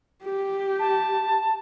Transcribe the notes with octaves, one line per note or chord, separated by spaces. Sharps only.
G4
A5